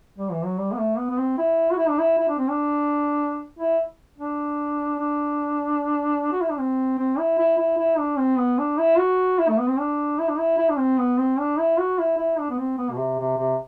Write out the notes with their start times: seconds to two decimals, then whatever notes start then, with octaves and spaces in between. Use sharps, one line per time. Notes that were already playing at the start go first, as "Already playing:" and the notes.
0.18 G3
0.32 E3
0.44 F#3
0.58 G3
0.72 B3
0.78 A3
0.98 B3
1.10 B3
1.18 C4
1.38 E4
1.71 F#4
1.78 E4
1.89 D4
1.99 E4
2.18 E4
2.29 D4
2.38 C4
2.49 D4
3.59 E4
4.18 D4
4.99 D4
6.32 F#4
6.41 E4
6.50 D4
6.59 C4
6.99 C4
7.18 E4
7.39 E4
7.58 E4
7.78 E4
7.98 D4
8.18 C4
8.38 B3
8.58 D4
8.78 E4
8.98 F#4
9.39 E4
9.49 A3
9.58 B3
9.68 C4
9.79 D4
10.19 E4
10.29 D4
10.39 E4
10.58 E4
10.70 D4
10.78 C4
10.98 B3
11.18 C4
11.39 D4
11.59 E4
11.78 F#4
11.99 E4
12.18 E4
12.39 D4
12.50 B3
12.59 C4
12.78 B3
12.91 B2
12.98 C3
13.19 C3
13.38 C3